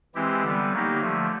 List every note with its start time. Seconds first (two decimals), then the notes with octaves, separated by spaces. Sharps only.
0.15 E3 G#3 C4 E4 G4
0.43 D3 G3 B3
0.72 F#3 A#3 D#4 G4
1.01 D3 F3 A3